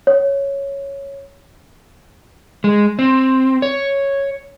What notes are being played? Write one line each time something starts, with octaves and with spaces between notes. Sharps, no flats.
C#5
G#3
C4
C#5